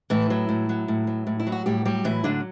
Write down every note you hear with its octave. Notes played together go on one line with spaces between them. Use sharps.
A2 E3 E4
F#3
A2
F#3
A2
F#3
A2
E4
F#3
F#4
A2 G3 G4
F#3 G3 G4
A2 E3 E4
D3 F#3 D4